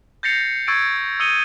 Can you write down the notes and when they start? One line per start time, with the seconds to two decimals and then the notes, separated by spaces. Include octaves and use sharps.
0.23 G6 A6 A#6 C7 C#7 F7
0.67 C#6 E6 G#6 A6 D7
1.20 D#6 E6 C#7 D#7 G7